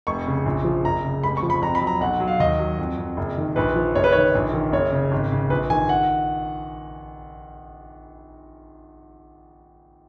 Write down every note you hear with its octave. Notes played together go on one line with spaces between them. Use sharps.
F1 C#6
C#3
A#1
F3
F#1 A#5
C#3
F1 B5
C#6
F3
B5
F2 A#5
B5
F#3
A#5
B1 F#5
F#3
F5
D#2 D#5
F#3
F2
F2
F#1
D#3
A#1 B4
F3
F#1 C#5
B4
D#3 C#5
A#1
D#3
F#1 C#5
C#3
G#1
C#3
A#1 B4
D#3 G#5
F#5